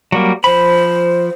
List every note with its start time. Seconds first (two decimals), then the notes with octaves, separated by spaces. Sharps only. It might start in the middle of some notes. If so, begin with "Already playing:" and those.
0.12 F#3 G3 A#3
0.44 F3 C5 B5